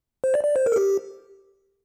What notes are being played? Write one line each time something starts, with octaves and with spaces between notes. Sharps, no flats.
C5
D5
D5
C5
A#4
A4
G4